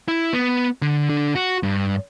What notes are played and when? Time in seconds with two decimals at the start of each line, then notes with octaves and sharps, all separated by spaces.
0.08 E4
0.33 B3
0.82 D3
1.10 D3
1.35 F#4
1.63 G2